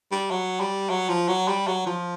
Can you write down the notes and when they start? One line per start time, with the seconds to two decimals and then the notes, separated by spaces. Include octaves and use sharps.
0.12 G3
0.31 F#3
0.60 G3
0.90 F#3
1.09 F3
1.28 F#3
1.48 G3
1.68 F#3
1.87 F3